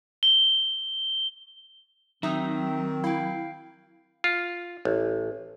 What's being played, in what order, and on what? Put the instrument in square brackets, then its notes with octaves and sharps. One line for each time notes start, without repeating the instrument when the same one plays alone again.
[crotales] G7
[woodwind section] D#3 C4 [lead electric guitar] F#3 [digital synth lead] D#4 [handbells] E5 D#6
[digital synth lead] E4 [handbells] F5 G5
[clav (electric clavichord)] F4
A1